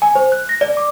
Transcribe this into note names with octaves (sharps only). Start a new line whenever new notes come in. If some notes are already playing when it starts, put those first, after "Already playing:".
G#5
C5
F#6
A#6
D5
D6